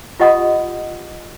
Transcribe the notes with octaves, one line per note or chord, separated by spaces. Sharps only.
F4 G4 D#5 F#5 B5 D#6